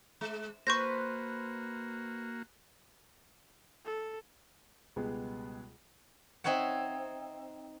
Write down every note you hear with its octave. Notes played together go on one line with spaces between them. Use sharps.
G#3
A#3 F#4 B4 C5 C#6 G6 A#6
A4
C#2 B2 G3 G#3 B3 G#4
C4 D#4 C#5 E5 F#5